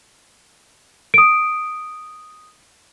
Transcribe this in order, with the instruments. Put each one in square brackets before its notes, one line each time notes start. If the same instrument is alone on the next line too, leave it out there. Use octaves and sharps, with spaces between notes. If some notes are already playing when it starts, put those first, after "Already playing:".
[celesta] D#6 D7